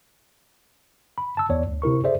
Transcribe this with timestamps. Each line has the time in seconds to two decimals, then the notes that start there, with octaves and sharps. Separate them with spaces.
1.18 B5
1.37 A5 E6
1.49 E2 B3 C#5 D5
1.67 D2
1.82 C3 E4 A#4 C#6
2.04 G#4 A4 C5 D5 E5